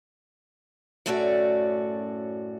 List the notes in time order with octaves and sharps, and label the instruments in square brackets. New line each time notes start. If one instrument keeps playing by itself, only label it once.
[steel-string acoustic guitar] F#2 A2 A3 C#4 F#4 D5